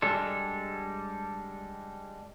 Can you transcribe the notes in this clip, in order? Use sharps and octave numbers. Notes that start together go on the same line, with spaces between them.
G3 G#3 D4 A4